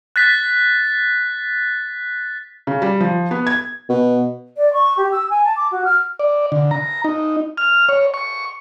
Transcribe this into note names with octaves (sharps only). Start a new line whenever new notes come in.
F#6 A6 B6
C#3
G3
F3
B3
G#6
B2
D5
C#6
G4
E6
G#5
A5
D6
F#4
F6
D5
D3
A#5
D#4
F6
C#5
C#6